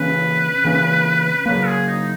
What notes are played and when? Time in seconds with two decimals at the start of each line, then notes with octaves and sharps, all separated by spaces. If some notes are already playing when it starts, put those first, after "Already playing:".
Already playing: C#3 E3 A#3 C#4 B4
0.64 C#3 E3 A#3 C#4
1.46 C#3 F#3 A#3 B4
1.67 G#4
1.88 D#4